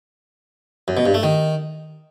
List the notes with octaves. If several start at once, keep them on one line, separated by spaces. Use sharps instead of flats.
F#2
B2
G2
A3
D#3